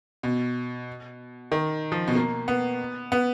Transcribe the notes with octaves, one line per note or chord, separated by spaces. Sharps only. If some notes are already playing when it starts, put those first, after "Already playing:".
B2
D#3
F3
B2
A#3
B3
B3